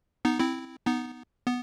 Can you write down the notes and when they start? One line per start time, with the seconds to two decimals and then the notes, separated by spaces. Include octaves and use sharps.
0.25 B3 D#4
0.40 C4 E4
0.86 B3 D#4
1.47 B3